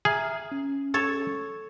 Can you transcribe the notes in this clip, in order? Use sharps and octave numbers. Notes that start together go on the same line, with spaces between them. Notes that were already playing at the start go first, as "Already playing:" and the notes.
G#4 E5 A#5 F6
C#4
A4 C#5